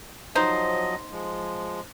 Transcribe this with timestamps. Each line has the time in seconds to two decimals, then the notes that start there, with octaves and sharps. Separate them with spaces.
0.35 F3 F#3 D#4 C5 D#5
1.12 F3 G#3